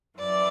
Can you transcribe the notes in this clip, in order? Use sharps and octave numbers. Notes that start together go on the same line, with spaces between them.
F#2 E3 D5